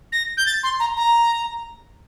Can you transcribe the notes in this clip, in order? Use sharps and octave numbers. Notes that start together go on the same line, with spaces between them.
A#6
G6
A6
C6
A#5
A#5